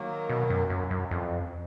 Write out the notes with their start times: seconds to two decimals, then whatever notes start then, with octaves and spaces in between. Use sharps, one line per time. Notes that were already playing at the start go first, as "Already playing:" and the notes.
Already playing: D#3 F#3 A#3
0.29 B2
0.50 F#2
0.70 F#2
0.90 F#2
1.11 F2